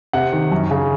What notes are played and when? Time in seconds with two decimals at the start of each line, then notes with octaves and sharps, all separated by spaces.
0.13 C3 F#5
0.33 D#3
0.52 F#2
0.71 C#3